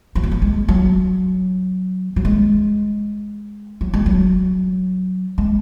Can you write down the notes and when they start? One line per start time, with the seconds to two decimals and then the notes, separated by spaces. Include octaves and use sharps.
0.15 F3
0.23 F#3
0.31 F3
0.42 G#3
0.68 F#3
2.16 F#3
2.25 G#3
3.81 F#3
3.94 G#3
4.06 F#3
5.38 G#3